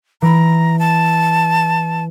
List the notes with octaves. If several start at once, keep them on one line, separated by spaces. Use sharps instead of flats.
E3 A#5 B5
A5